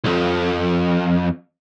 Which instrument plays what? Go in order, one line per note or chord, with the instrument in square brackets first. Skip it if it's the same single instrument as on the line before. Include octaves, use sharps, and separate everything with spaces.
[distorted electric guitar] B1 F2